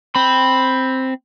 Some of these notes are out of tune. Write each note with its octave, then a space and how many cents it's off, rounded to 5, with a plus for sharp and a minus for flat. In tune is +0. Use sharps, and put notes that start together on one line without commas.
C4 +0 B5 +0